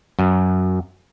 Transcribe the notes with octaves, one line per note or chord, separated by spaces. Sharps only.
F#2